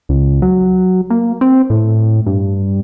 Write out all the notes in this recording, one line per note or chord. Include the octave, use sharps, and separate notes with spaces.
C#2
F#3
A#3
C4
A2
G2